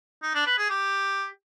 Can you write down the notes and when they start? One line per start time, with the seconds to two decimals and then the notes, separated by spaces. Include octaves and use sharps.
0.22 D#4
0.34 D4
0.46 B4
0.58 G#4
0.70 G4